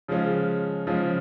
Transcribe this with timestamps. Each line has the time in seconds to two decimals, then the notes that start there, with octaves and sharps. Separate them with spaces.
0.08 C#3 F3 G#3 C#4 F4
0.87 C#3 F3 G#3 C#4 F4